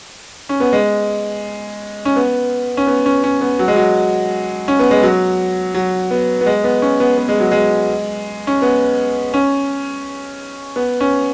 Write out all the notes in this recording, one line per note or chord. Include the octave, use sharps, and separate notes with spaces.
C#4
B3
G#3
C#4
B3
C#4
B3
C#4
C#4
B3
F#3
G#3
F#3
C#4
B3
G#3
F#3
F#3
B3
B3
G#3
B3
C#4
B3
B3
G#3
F#3
G#3
C#4
B3
C#4
B3
C#4